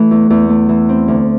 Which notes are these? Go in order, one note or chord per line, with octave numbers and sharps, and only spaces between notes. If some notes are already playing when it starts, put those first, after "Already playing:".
Already playing: E3 A3
E2
E2
A3
E3
C4
D2